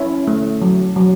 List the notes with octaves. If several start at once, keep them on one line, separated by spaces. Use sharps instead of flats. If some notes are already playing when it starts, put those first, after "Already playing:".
Already playing: C#4 E4
A3
F#3
F#3